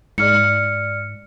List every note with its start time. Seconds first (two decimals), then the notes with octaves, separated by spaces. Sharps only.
0.18 G#2 D5 F6 C#7